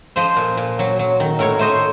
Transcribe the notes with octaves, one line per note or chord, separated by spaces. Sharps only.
F3 C5 D#5
A#2
A#2
F#3
F#3
D#3
A2 A#4 C#5
A3 C5 D#5